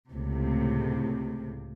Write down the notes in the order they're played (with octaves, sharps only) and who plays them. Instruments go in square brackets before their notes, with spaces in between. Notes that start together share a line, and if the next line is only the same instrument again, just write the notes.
[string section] C#2 A2 C3